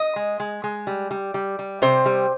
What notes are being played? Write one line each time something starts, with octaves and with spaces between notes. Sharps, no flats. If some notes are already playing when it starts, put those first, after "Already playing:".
Already playing: D#5
G#3
G#3
G#3
G3
G3
G3
G3
C3 C5
G3